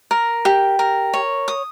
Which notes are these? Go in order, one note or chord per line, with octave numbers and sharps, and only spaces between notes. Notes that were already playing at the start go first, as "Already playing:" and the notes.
A#4
G4
A#4
C#5
D#6